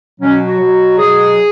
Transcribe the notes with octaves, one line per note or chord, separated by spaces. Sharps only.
B2 F#3 C#4
F#4
B2 F#3
B2 F#3 G#4